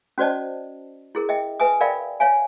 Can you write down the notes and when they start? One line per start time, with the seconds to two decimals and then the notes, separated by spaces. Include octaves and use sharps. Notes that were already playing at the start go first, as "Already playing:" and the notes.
0.18 C#4 F#4 C5 D5 D#5 A5
1.15 E4 G#4 A#4
1.29 D#5 E5 G5
1.60 B4 E5 G#5 D#6
1.80 A#4 D5 E5 F5 G5 B5
2.20 C#5 E5 F5 G#5